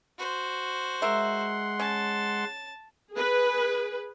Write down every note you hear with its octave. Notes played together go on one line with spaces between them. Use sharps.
F#4 C5
G#3 A#4 E5 F#5 C6
C#4 A5
G#4 B4